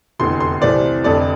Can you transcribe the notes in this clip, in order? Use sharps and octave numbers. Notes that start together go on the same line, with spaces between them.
F1 E2 D3 C6
C6
C2 C3 E3 A3 C4 D5
F1 F2 D3 D5